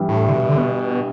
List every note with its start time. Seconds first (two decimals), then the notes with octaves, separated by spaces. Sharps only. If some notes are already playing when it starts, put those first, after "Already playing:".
Already playing: G2 E3 G3
0.09 A2
0.28 D3
0.32 B2
0.49 D3
0.57 B2